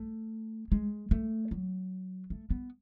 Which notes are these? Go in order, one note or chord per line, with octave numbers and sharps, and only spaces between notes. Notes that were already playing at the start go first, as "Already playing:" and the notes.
Already playing: A3
G#3
A3
F#3
A3
B3